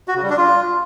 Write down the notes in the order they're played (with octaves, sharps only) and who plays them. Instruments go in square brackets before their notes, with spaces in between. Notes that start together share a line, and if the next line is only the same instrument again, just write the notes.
[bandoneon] F#4
C#3
G3
D4
F4